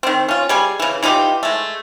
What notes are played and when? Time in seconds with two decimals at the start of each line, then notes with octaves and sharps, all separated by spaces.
0.03 D#3 C4
0.29 C#4 F4
0.49 G3 G#4 G#5
0.80 C#3 E3
1.03 E3 D#4 F4 G4
1.43 G#3 A3